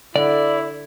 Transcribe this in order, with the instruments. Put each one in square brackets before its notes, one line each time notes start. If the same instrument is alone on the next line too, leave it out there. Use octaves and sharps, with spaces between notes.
[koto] D3 [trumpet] E4 [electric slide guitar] D5